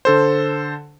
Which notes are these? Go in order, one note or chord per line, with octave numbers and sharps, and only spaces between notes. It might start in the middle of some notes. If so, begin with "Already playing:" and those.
D3 A4 C5